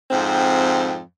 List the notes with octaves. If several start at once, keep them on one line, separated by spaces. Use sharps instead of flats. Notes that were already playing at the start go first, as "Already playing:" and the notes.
F2 G#2 C4